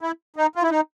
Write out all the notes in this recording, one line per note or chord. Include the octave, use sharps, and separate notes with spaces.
E4
D#4
F4
E4
D#4